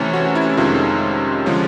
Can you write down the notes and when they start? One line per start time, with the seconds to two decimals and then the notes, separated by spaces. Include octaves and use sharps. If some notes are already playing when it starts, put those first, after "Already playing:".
Already playing: C3 E3 A3 C#4
0.13 F#4
0.35 E4
0.54 E4
0.57 F2 C3 D#3 G#3 C#4 F4
1.46 D3 F3 G#3 C#4